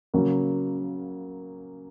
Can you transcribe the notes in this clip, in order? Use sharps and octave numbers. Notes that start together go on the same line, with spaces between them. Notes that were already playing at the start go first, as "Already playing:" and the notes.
C#3 F#3 A#3